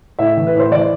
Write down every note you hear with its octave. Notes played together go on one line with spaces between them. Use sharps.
A2 E5
E3
B4
A2 C5
E3 D5